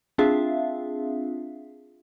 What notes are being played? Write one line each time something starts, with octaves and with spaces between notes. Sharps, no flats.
C4 D4 F4 G#4 E5 F5